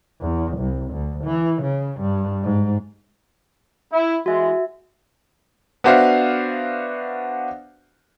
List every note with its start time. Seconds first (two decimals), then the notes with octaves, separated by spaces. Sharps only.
0.21 E2
0.58 C2
0.92 D2
1.24 E3
1.62 C#3
2.00 G2
2.43 G#2
3.91 E4
4.26 E3 G#3 F#4 E5
5.84 B3 D4 F#4 C5 E5 F5